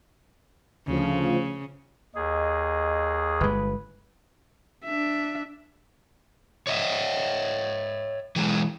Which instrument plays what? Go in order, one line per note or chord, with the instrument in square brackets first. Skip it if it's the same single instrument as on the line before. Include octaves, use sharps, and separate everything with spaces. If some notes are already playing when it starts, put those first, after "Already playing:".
[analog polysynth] D2 F3 [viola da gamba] C#3
[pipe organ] D#2 G#4 [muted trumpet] D#5
[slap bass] G1 G#3 [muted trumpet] B4
[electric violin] D4 E5
[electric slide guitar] C#5 D#5 E5
E3 F#3 G#3